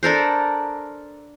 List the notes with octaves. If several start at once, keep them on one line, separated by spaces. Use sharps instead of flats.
D4 A4 A#4 C5